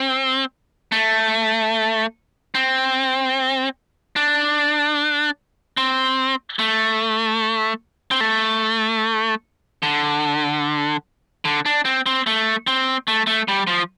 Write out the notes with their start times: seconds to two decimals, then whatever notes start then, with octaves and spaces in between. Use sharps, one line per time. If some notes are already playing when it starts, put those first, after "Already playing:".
Already playing: C4
0.92 A3
2.55 C4
4.16 D4
5.77 C4
6.59 A3
8.11 C4
8.21 A3
9.83 D3
11.45 D3
11.66 D4
11.85 C4
12.06 C4
12.27 A3
12.67 C4
13.08 A3
13.27 A3
13.48 G3
13.67 F3